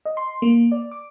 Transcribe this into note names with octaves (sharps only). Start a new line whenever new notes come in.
D#5
C6
A#3
D5
D6